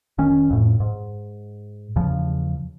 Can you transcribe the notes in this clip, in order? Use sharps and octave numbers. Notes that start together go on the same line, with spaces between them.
F1 D#3 C#4
F2 A2
G#2
E2 C#3 F3